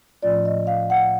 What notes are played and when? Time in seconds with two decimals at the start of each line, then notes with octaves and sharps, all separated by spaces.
0.23 A2 F3 A3 C#4 F4 D5
0.45 D#5
0.67 F5
0.90 F#5